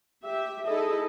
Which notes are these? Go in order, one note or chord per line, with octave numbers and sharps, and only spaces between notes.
G4 E5
D#4 E4 G#4 A4 D#5